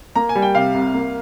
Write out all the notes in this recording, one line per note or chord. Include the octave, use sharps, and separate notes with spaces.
A#3 A#5
G#5
G3
G5
C3 F5
C2
A#3